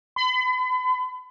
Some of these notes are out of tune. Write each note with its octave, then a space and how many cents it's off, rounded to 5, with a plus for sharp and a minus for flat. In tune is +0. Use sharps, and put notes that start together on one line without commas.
B5 +40